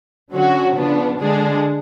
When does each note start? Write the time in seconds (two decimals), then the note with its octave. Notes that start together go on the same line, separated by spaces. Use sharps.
0.31 D3 F#3 C#4 F#4
0.76 C#3 F3 B3 D4
1.19 D3 G#3 D4 G#4